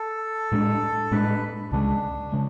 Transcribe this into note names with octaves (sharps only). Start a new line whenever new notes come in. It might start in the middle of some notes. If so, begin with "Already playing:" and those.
Already playing: A4
A2 G#3 D4
A2 G#3 D4 B4
C#2 C#3 G#3 D4
C#3 G#3